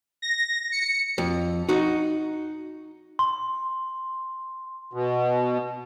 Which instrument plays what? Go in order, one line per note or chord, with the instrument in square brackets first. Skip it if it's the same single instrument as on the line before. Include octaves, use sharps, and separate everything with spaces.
[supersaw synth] A#6
C#7
[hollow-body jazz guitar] F2
D#4 F#4
[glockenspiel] C6
[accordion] B2